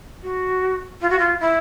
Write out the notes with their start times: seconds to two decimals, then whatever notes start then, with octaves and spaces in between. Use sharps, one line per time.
0.22 F#4
1.01 F4
1.09 F#4
1.19 F4
1.40 E4